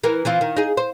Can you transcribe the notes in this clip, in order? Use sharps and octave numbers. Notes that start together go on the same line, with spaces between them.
E3 A#4
E3 C4 F4
D#3
D#4 G#4
C5